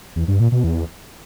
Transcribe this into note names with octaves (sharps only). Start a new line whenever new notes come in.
E2
G2
A#2
B2
E2